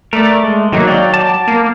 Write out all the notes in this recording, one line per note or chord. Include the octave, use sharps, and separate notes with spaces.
A3 A#4 D5
G#3
D#3 F#3 A#3 D#4
D5 F5 G5
A5 D6
A#3